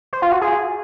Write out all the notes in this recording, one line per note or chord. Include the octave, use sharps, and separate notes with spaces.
C5
F4
F#4
G#4